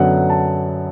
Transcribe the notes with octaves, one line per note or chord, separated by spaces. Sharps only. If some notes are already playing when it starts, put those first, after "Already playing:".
Already playing: F#2 D3 F#3 B3 F#5
A5